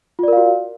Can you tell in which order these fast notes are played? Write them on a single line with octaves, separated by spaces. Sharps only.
F4 D5 A#4 F5 F#4